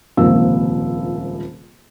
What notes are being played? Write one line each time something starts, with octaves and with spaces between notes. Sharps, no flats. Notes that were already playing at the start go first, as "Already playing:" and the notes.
D#1 C#2 C3 F3 A#3 E6